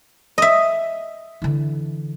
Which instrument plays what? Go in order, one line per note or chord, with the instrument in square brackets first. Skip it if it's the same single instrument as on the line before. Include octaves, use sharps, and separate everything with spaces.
[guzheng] D#5 E5
[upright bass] D3 E3